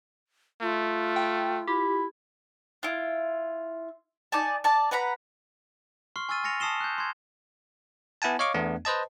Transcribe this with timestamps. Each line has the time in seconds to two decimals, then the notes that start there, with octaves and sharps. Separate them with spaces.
0.62 A3 F4
1.16 G5
1.68 E4 G4
2.83 E4 F4
4.32 D#4 D5 G#5 A5
4.64 D5 A5
4.91 B4 F#5 A#5 B5
6.16 C6 C#6 F6 C7
6.29 G#5 C#6 E6 F6 A6 D#7
6.44 G#5 A6 A#6 C#7 F7
6.60 A5 D#6 C7 E7 G7
6.81 F#6 G6
6.98 C6 G#6
8.22 B3 E4 F#5 G#5 A5
8.39 C#5 D#5 F5 C#6 D6
8.54 E2 A3 B3 D4
8.85 B4 C5 D#5 A5